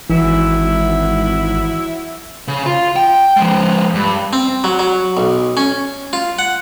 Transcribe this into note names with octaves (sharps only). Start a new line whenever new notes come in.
G#1 E3 F#3 E4
C#3
F4
G5
F3 G#3
G2
C4
F#3
F#3
B1
C#4
F4
F#5